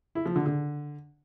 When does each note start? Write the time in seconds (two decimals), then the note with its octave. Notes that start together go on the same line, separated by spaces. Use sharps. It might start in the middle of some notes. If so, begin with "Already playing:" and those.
0.15 E4
0.26 F3
0.36 D3
0.46 D3